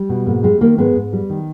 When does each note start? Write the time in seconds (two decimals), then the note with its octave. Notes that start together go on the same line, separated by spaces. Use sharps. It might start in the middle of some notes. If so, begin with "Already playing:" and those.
Already playing: G3
0.09 B2
0.26 G#2 A#3
0.43 G3 G#3
0.61 D#3 A#3
0.78 G#2 G#3 B3
0.95 G#2
1.13 G3
1.30 D#3